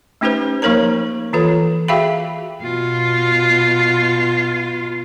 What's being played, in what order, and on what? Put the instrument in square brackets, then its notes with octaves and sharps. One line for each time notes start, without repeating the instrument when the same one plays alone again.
[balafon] A3 C#4 D#4 G4 B4 C5
F3 A#3 D#4 A#4 C#5 A#5
E3 F4 A4 B4 C#5
F#4 G#4 E5 F5 G5 B5
[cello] B2 F4